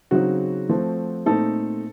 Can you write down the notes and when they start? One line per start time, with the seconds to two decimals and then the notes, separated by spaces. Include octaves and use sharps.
0.11 C#3 F#3 C4 D#4 F#4
0.69 F3 A3 C4
1.26 A#2 A3 C4 D#4 A4